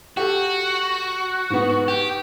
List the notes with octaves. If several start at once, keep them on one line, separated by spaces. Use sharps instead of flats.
F#4 G4 A4
G#2 B3
G4